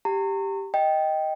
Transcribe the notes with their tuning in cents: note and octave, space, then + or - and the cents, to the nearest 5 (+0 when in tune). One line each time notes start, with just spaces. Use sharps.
G4 +0 A#5 -35
D#5 +5 G5 -5